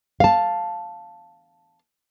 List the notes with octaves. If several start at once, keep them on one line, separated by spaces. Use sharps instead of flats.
F5 A5